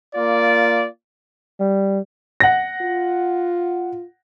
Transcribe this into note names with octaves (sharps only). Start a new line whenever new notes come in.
A#3 F4 D5
G3
F#5 A#6
F4